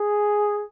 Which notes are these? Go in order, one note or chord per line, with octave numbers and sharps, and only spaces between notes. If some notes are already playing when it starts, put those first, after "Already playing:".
Already playing: G#4